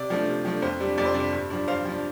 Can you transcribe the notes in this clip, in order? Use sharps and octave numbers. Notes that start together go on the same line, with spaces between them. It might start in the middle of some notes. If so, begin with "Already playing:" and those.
Already playing: C3 D5
F3 A3 D4
C3
F3 A3 D4
F2 C5
C3 G3 D4
F2 D5
C5
C3 G3 D4 D5
G2
F3 D4
G2 C5 F5
F3 D4